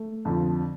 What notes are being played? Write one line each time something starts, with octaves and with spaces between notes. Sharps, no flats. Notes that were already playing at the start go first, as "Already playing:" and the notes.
Already playing: A3
F2 D3 F3